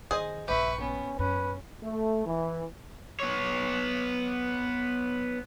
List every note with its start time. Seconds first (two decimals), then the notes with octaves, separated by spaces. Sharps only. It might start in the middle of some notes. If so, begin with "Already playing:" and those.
0.11 D#3 G#4 C5 D#5
0.48 A#1 G2 G4 B4 E5 C#6
0.81 B3 C#4
1.19 F#2 C#4 B4
1.83 A3
2.25 E3
3.20 B3 C#5